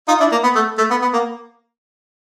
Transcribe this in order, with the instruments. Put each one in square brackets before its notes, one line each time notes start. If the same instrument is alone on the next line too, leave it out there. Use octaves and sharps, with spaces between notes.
[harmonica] D#4 F4
D4 E4
A#3
B3
A3
A3
B3
B3
A#3